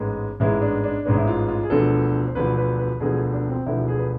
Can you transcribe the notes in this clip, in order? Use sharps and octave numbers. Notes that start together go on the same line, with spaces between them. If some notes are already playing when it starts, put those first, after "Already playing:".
Already playing: A1 G#2 G#3 B3
A1 G#2 G#3 B3 E4
D4
D4
A1 G#2 G#3 B3 D4
E4
F4
F4
G#4
E1 D2 D3 F3 B3 A4
C5
E1 D2 D3 F3 B3 B4
B4
B4
E1 D2 D3 F3 B3 G#4
G#4
F4
D4
C4
E1 D2 D3 F3 B3 E4
G#4
B4